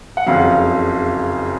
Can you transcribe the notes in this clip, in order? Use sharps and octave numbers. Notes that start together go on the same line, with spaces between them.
F#5
F#1 F2 C#3 F#3 F5